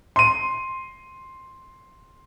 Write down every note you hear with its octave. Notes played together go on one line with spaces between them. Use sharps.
C6 D#7